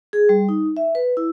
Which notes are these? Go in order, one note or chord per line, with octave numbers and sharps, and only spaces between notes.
G#4
G3
D#4
E5
B4
E4